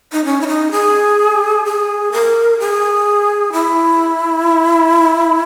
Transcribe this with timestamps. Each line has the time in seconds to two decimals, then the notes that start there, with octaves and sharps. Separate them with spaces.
0.12 D#4
0.25 C#4
0.41 E4
0.48 D#4
0.72 G#4
1.65 G#4
2.12 A#4
2.59 G#4
3.53 E4